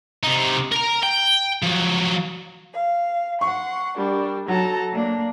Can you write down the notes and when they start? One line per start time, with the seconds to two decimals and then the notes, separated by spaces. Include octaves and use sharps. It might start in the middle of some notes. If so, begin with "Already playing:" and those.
0.24 C3 D#4
0.72 A#4 A#5
1.03 G5
1.63 F3 F#3
2.73 F5
3.41 F#5 C6 C#6
3.97 G3 D4 A#4
4.48 F#3 A4 A5 A#5
4.92 A#3 D4